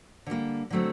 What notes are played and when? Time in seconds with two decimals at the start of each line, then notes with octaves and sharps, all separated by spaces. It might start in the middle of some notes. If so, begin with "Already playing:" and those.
0.26 D3 G3 A#3
0.70 D3 F#3 A3 C4